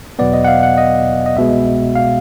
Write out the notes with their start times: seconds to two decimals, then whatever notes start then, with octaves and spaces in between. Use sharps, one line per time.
0.19 E2 B2 F#3 B3 D5
0.33 D#5
0.44 F#5
0.48 F5
0.63 F#5
0.78 D#5
1.26 D#5
1.36 C2 B2 G#3 E5
1.95 F5